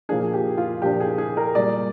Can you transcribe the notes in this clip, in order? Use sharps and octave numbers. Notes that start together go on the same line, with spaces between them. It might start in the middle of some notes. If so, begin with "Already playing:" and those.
A#2 F3 A#3 D4 G#4
G4
F4
A#2 F3 A#3 D4 G4
G#4
G#4
A#4
A#2 G3 A#3 D5